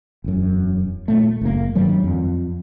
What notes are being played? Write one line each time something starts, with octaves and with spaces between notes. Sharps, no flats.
E1 F#2
A#2 A3
F#1 A2 A#3
G2 D#3 F#3 G3
F2